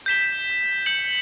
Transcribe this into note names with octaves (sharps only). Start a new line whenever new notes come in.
G6 B6 E7 G7
G6 C#7 F#7